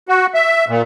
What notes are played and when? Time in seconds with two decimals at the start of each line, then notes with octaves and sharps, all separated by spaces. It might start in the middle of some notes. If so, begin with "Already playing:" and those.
0.08 F#4
0.34 E5
0.69 A#2